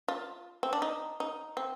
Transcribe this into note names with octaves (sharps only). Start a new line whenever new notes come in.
F4
C4
D4
D#4
D#4
C4